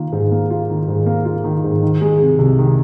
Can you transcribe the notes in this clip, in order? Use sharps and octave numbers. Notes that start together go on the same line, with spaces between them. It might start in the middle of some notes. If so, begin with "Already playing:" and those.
Already playing: D#3 A#3 F4
G#2
A#3
F4
D#3
G#2
A#3
F4
D#3
G#2
D#3
G#3
C3
C2
D#3